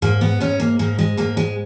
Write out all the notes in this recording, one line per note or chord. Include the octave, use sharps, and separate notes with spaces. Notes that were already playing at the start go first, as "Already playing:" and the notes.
G#2 A#3
B3
G#2 C#4
A#3
G#2 A#3
G#3
G#2 A#3
G#3